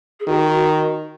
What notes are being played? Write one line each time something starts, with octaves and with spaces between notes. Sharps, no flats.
G#4
D#3 F#4
F#4